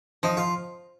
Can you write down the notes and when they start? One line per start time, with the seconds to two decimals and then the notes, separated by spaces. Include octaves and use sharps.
0.23 F3 D#4
0.37 F4